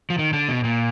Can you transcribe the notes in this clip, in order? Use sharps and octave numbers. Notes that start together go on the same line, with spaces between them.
F3
D#3
D3
B2
A#2